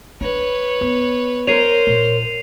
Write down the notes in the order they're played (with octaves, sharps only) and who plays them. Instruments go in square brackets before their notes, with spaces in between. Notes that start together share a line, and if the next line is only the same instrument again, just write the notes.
[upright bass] D4 [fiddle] B4 C#5
[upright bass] B3
[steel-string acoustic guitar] A#4 C#5 [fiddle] C5 [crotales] C7 D#7 F7
[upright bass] A#2